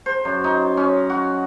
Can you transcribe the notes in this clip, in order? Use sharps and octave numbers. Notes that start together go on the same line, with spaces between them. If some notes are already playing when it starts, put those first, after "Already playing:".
C5
F#2
D#4
C#4
F#4